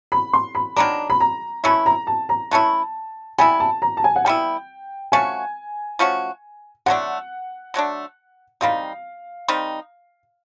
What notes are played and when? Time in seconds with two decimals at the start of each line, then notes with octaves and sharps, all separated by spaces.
0.12 B5
0.33 C6
0.55 B5
0.76 D#3 F#3 B3 D4 A#5
1.10 B5
1.20 A#5
1.64 E3 A3 C#4 E4 B5
1.86 A#5
2.07 A5
2.29 A#5
2.51 E3 A3 C#4 E4 A5
3.38 G3 B3 E4 G#5
3.60 A5
3.82 A#5
3.97 A5
4.04 G#5
4.16 F#5
4.25 G3 B3 E4 G5
5.12 F3 A3 C#4 F#4 G#5
5.99 F3 A3 C#4 F#4
6.86 D3 F#3 A3 D4 F#5
7.74 D3 F#3 A3 D4
8.61 D#3 G3 C4 D#4 F5
9.48 D#3 G3 C4 D#4